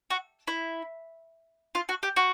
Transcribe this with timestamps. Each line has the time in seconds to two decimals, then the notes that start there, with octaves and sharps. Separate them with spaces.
0.10 F#4
0.48 E4
1.75 F4
1.89 F#4
2.03 G4
2.16 F#4